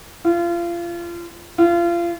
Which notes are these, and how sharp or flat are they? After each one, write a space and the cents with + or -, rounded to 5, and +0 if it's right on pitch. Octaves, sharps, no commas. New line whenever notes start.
F4 -30
F4 -30